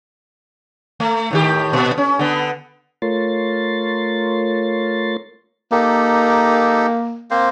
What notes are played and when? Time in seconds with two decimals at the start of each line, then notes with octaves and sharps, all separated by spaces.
1.00 A3
1.31 A2 D#3 G4
1.73 A#2
1.97 C#4
2.19 D3 B3
3.02 A3 F4 A#4 C#5 C6 A6
5.72 A#3 D#4 G4 A4
7.31 A#3 C4 C5